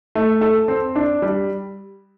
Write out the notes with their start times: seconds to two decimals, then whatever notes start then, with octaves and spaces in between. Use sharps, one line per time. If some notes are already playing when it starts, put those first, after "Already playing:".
0.15 A3
0.41 A4
0.68 C4
0.95 D4
1.22 G3